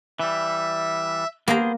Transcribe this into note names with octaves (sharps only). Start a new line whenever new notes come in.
E3 G3 E5
A#3 B3 G#4 C5 A#5